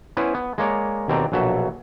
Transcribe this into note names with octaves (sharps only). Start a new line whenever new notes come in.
B3 C#4 E4 B4 C5
B3
G#3 A#3 C#5 D5
D#2 B2 C4 A4 D5 A#5
A#1 B2 F#3 A4 E5